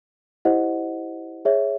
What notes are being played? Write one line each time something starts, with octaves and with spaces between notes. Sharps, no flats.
E4 G4 C5 D#5 F#5
G#4 C#5 E5